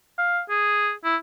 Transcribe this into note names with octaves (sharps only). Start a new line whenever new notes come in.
F5
G#4
E4